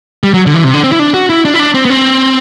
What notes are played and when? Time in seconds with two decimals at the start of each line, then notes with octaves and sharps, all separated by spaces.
0.23 G3
0.34 F#3
0.47 D3
0.54 E3
0.64 C3
0.74 D3
0.84 C4
0.92 E4
0.99 D4
1.14 F#4
1.30 E4
1.45 D4
1.54 E4
1.59 D4
1.74 C4
1.85 B3
1.90 C4